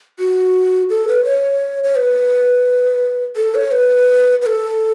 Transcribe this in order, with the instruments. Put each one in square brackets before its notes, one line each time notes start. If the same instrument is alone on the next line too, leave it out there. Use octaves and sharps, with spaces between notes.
[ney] F#4
A4
B4
C#5
C#5
B4
A4
C#5
B4
B4
A4